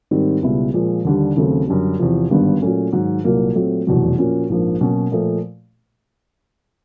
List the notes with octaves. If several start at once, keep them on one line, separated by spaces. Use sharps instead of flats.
G#2 D#3 G3 C4
C#2 B2 G3 B3 E4
A#2 F3 G#3
D#2 D3 G3
D#2 C#3 F#3 A3 C4
F#2 D3 G3
E2 C3 F3
G#1 G2 D3 G3 B3
A#2 F#3 A3 C#4
G#2 D#3 F#3
C2 A#2 F#3 A#3
A#2 F#3 A3 C4
F1 E2 B2 F#3
A#2 F3 A#3 C#4 F#4
A#1 G#2 F3 A#3
B2 F#3 A#3 C#4 F#4
A#2 F3 A3